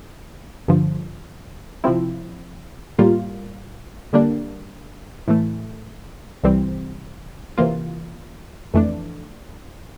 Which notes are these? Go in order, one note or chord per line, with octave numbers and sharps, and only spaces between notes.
G2 D3 F3
C3 F3 C4 E4
A2 G3 A#3 F4
D3 G3 A#3 D4
A2 E3 A3
C2 C3 E3 G3 C4
C3 E3 A#3 F4
F2 E3 A3 D4